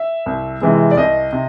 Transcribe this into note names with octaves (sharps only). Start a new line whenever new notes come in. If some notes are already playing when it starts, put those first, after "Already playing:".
Already playing: E5
C2
C3 E3 G#3
D5
C2 D#5
C3